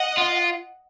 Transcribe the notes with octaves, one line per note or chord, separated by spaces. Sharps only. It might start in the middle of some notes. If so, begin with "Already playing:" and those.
Already playing: D#5 F#5
F4